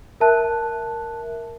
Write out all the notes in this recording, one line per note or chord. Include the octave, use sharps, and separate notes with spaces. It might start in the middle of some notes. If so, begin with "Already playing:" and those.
A#4 E5 A5 F#6